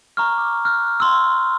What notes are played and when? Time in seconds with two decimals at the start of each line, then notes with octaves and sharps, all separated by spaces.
0.17 A#5 C#6 F6
0.38 D6
0.65 F6 F#6
1.00 C6 E6